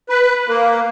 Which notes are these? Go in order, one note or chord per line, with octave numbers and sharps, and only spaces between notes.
B4
A#3